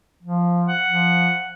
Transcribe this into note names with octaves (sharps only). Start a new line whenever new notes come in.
F3
F#5
F3